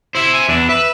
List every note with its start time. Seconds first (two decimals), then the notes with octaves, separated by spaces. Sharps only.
0.15 E4 C5 E5
0.34 G#5
0.48 E2 D4
0.69 B4 E5